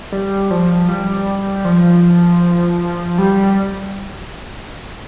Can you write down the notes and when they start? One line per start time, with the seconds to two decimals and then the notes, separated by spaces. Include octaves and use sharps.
0.12 G3
0.51 F3
0.88 G3
1.65 F3
3.18 G3